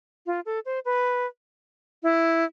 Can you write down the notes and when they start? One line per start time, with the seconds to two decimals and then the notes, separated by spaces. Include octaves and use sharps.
0.26 F4
0.46 A4
0.66 C5
0.85 B4
2.03 E4